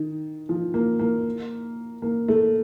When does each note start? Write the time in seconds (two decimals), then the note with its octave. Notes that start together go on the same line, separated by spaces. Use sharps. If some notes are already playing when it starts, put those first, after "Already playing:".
Already playing: D#3
0.49 F3
0.74 A#3
0.99 A#3
2.02 A#3
2.28 A3